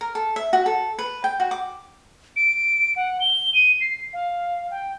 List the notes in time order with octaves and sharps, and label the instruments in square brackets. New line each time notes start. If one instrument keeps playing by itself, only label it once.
[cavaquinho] A#4
A4
E5
F#4
A4
B4
G5
F#4
D6
[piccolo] D7
F#5
G7
D#7
C7
F5
G5